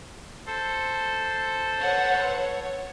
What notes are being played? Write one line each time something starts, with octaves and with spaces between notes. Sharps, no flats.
A4 C5
B4 C#5 F#5
C#5